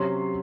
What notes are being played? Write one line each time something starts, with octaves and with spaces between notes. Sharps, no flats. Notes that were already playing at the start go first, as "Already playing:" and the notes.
Already playing: C3 F#3 C#4 C6